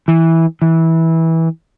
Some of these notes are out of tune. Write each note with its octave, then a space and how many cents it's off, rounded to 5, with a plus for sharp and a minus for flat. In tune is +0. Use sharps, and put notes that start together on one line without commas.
E3 -10
E3 -15